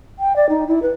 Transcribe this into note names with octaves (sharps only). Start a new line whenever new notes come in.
G5
D5
D#4
E4
B4